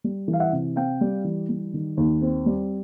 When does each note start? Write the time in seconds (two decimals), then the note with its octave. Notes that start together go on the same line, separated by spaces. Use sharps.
0.04 G3
0.28 E3
0.33 F5
0.40 E5 F#5
0.53 C3
0.76 C4 F5 G5
1.01 G3
1.24 E3
1.49 G3
1.74 D#3
1.97 D#2
2.22 C4
2.46 G3